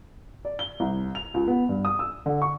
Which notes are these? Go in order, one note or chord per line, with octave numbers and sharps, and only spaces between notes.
D5
G7
C2
F7
C#2
B3
G2
D#6
E6
D3
C#6